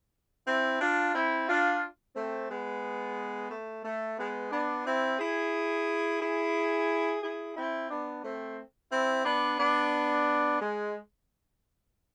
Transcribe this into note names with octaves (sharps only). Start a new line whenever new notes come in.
C4 E4
D4 F4
C4 E4
D4 F4
A3 C4
G#3 B3
A3
A3
G#3 B3
B3 D4
C4 E4
E4 G#4
E4 G#4
E4 G#4
C4 E4
B3 D4
A3 C4
C4 E4
B3 D4
B3 D4
G#3